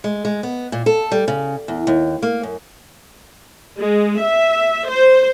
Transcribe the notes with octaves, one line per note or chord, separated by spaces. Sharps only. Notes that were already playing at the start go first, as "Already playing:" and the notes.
G#3
G#3
B3
A#2
A4
G3
C#3
E2
D#2
A#3
F#2
G#3
E5
C5